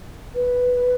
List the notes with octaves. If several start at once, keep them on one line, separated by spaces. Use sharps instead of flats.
B4